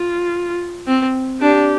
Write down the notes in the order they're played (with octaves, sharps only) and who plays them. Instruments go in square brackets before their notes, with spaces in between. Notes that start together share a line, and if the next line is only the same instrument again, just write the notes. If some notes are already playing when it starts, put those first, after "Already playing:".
Already playing: [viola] F4
[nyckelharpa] C4
[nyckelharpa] D4 [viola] G4